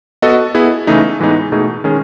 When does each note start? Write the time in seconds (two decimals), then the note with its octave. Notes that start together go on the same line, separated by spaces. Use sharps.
0.22 B3 F#4 A4 D#5
0.54 B3 E4 G#4
0.87 C#3 E3 A3 D#4
1.20 A2 E3 G#3 B3 D#4
1.52 B2 A3 D#4 G#4
1.84 D#3 G#3 C#4 G#4